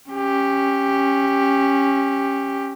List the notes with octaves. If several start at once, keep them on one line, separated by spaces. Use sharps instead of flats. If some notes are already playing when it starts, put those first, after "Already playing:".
C#4 G4